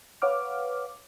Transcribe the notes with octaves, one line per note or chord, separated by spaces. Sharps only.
B4 C#5 F5 F#5 D6 F6